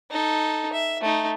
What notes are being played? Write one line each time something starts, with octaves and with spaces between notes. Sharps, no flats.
D#4 A4
E5
A3 D#4